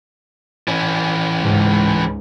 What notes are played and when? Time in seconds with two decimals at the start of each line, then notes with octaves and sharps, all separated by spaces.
0.68 E3 C#4
1.38 C#2 G#2